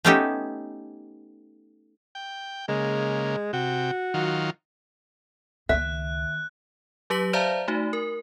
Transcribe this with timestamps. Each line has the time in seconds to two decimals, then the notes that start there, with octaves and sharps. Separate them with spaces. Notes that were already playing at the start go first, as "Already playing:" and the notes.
0.05 A3 B3 C#4 D#4 G4 A4
2.15 G5
2.68 C#3 G#3 A#3
3.53 C3 F#4 G5
4.14 D#3 F#3 F4
5.69 C#2 D#3 A#3 E5 F#6
7.10 F#3 G4 B4 B6 F#7
7.33 C5 D5 E5 F5 A5 A#5
7.68 A3 D#4 F#4
7.93 A#4